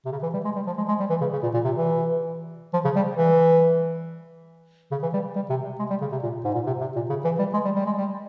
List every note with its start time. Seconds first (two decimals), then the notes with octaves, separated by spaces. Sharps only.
0.05 C3
0.12 C#3
0.23 E3
0.33 G3
0.45 G#3
0.56 G3
0.67 F3
0.78 G#3
0.88 G#3
1.00 G3
1.10 E3
1.21 C#3
1.33 C#3
1.43 A#2
1.54 A#2
1.65 C3
1.76 E3
2.74 F3
2.85 C#3
2.96 G3
3.17 E3
4.92 C#3
5.03 E3
5.14 G3
5.36 G3
5.50 C3
5.79 G#3
5.90 G3
6.01 C#3
6.12 C3
6.23 A#2
6.45 G#2
6.55 A#2
6.66 C3
6.81 C3
6.96 A#2
7.10 C#3
7.25 E3
7.39 G3
7.54 G#3
7.65 G3
7.76 G3
7.86 G#3
7.98 G3